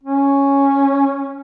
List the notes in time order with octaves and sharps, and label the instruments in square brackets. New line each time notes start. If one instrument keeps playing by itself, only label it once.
[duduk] C#4